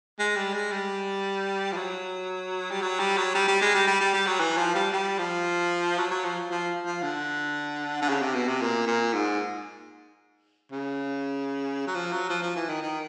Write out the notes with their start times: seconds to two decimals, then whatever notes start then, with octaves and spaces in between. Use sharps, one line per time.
0.19 G#3
0.36 G3
0.54 G#3
0.72 G3
1.72 F3
1.76 F#3
2.71 G3
2.82 F#3
2.99 G3
3.17 F#3
3.34 G3
3.48 G3
3.61 G#3
3.74 G3
3.87 G3
4.00 G3
4.14 G3
4.27 F#3
4.40 E3
4.57 F3
4.75 G3
4.92 G3
5.19 F3
5.98 F#3
6.11 F#3
6.24 F3
6.51 F3
6.85 F3
7.02 D3
8.02 D3
8.09 C#3
8.22 C3
8.35 B2
8.48 C3
8.61 A#2
8.87 A#2
9.14 G#2
10.72 C#3
11.87 F#3
11.94 F3
12.12 F#3
12.29 F3
12.42 F3
12.56 E3
12.69 D#3
12.82 D#3